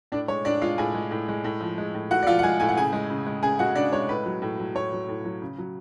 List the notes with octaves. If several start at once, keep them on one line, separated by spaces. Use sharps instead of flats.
A2 D4 D5
G#3 C#5
A2 D4 D5
G#3 F4 F5
A2 G#4 G#5
G#3
A2
G#3
A2
F3
G#3
A2
A2 F#4 F#5
D5
F3 F4 F5
F#5
G#3 G#4 G#5
A2 G#5
F#5
C#3 G#4 G#5
G#3
C#3
G#3
C#3 G#4 G#5
G#3 F#4 F#5
C#3 D4 D5
G#3 C#5
A2 B4
F#3
A2
F#3
A2 C#5
F#3
A2
F#3
C#3
F#3